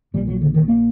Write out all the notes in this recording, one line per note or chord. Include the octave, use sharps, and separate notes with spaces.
A#1 A#2 G3
F#3
D3
D#3
A#3